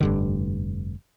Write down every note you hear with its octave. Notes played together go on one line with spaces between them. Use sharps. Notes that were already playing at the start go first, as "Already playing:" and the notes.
F1 G2 D3